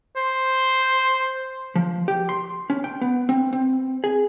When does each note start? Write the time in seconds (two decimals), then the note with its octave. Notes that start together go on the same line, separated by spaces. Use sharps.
0.16 C5
1.75 F3
2.08 G4
2.29 C6
2.70 C#4
2.84 G5
3.01 B3
3.29 C4
3.53 C4
4.04 G#4